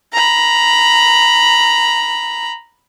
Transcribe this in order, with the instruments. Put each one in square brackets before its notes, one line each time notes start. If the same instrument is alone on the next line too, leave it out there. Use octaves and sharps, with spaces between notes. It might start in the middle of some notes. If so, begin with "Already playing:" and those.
[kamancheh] A#5 B5